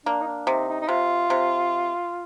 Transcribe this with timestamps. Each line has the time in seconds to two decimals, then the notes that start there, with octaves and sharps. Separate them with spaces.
0.06 A#3 D4
0.21 D#4
0.27 D4
0.47 C3 D#4
0.68 D#4
0.81 D#4
0.88 C3 F4
1.30 C3